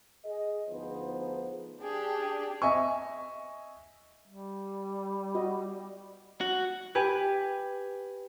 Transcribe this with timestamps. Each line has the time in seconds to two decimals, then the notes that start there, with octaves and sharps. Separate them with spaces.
0.25 G#4 D#5
0.68 D2 F3 B3 D#4 G#4 C5
1.82 D4 G4 G#4
2.62 D#5 E5 G#5 C#6
4.28 G3
5.35 F#4 D#5
6.41 F#4
6.95 G4 B4 G#5